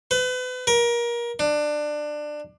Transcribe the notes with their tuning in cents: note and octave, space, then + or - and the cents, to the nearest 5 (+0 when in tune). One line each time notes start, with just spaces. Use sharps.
B4 +35
A#4 +25
D4 +20